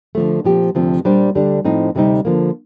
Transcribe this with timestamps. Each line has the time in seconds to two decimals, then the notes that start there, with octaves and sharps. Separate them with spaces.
0.15 D3 F3 A3
0.44 A#2 F3 C4 G4
0.75 D2 C3 F3 C4
1.05 A#2 G3 D4 G4 C5
1.35 D2 D3 G3 D4
1.65 A2 F3 C4 D#4
1.95 D2 C3 G3 C4 D#4
2.25 D3 F3 A#3